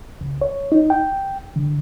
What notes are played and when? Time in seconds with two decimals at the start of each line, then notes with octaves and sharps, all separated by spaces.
0.21 C#2
0.41 C#5
0.72 D#4
0.90 G5
1.56 D3